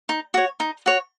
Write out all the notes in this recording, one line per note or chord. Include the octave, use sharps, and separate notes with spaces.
D#4
F#4 C#5
D#4
F#4 C#5